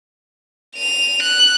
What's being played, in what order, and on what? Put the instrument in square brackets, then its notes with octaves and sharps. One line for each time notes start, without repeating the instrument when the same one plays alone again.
[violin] D#7 F7
F#6